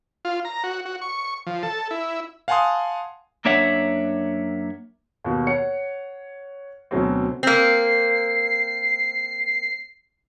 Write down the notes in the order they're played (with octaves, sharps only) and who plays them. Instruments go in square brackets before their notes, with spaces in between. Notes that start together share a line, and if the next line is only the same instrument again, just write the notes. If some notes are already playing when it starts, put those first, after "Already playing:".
[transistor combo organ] F4
A#5
F#4
F#4
C#6
F3
A4
E4
[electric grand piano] F5 F#5 G#5 A5 C6 D#6
[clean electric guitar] F#2 A#3 D4 C#5 E5 F#5
[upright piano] D#2 B2
C#5 F#5 C#7
D2 B2 F#3 C4
[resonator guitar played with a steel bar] A#3 C4 [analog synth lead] C7